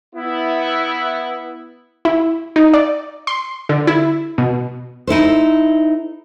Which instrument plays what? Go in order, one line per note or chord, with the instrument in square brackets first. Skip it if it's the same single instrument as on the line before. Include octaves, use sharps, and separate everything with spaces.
[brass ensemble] B3 E4
[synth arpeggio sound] E4
D#4
D5
C6
D3
E4
B2
[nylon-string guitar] D#4 E4 A4 C5